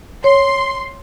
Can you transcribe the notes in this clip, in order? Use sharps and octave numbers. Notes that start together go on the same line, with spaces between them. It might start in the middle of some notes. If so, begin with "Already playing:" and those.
C#5 C6